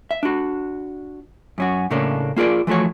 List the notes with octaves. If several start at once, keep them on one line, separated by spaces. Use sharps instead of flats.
E5
D4 F#4
F#2 C#4 F#4
A2 C#3 A3 A#3 C#4 D4
A#3 F4 G#4 A#4 D5
E3 F3 A3 F#4 C#5